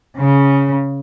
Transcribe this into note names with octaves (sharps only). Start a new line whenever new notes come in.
C#3